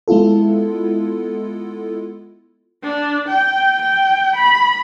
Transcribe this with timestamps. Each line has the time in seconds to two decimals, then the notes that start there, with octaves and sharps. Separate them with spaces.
0.08 G#3 B3 E4 F4 A4
2.84 D4
3.28 G5
3.81 G5
4.36 B5